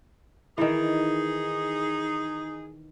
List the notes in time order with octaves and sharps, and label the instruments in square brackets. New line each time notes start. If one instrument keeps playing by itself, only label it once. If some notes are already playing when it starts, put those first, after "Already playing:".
[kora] D#3 E3 [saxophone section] D#4 G#4